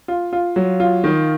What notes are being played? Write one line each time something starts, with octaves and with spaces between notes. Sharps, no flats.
F4
F4
F#3
F4
D#3